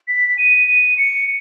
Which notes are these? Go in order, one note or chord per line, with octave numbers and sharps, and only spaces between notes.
B6
D#7
D#7
C#7